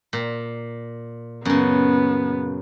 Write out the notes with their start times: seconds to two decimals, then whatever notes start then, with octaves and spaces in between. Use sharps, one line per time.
0.13 A#2
1.45 F#2 C#3 B3